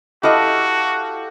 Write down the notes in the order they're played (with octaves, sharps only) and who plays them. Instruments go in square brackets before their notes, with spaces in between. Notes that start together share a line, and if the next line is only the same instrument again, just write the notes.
[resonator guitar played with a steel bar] E4 D#5 [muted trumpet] F#4 [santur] G4 A4 F5